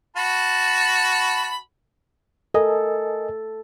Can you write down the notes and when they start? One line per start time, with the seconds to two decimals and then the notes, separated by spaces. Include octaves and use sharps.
0.16 F#4 A5 B5
2.54 A4 A#4 D#5 G#5